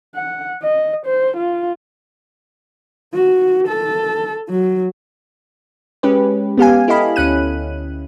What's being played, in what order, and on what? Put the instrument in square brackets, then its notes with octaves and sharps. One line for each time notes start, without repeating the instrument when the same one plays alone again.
[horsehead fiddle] F#5
D#5
C5
F4
F#4
A4
F#3
[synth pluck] G#3 C#4 G4 B4
B3 G4 F5 G#5
E4 G4 A4 D#5 F5 B5
D2 C#4 F#6 D#7